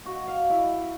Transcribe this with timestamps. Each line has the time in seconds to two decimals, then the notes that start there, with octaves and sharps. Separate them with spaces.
0.06 F#4
0.27 F5
0.50 E4